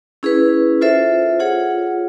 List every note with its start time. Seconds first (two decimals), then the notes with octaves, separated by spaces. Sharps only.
0.23 C#4 E4 G#4 B4
0.81 F4 A4 C5 E5
1.39 F4 G#4 C#5 F#5